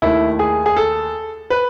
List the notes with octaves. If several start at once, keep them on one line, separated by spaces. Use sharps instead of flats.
D#2 D#3 A3 E4
G#4
G#4
A4
B4